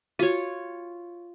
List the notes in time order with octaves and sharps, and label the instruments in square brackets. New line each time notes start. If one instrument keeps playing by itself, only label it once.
[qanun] F4 C#5 [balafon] F#4